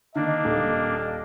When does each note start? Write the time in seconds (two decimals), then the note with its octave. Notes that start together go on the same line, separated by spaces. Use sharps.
0.15 D3 D#3 A#3 D4 D#5
0.45 D#1